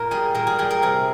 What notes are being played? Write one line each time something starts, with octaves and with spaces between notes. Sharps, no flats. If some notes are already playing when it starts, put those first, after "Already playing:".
Already playing: A#2 A#4
G3 G#4
A#2 A#4
G#4
G3 G#4
A#4
C3 G#4